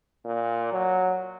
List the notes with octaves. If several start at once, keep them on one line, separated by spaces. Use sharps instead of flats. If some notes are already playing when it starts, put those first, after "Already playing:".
A#2
F#3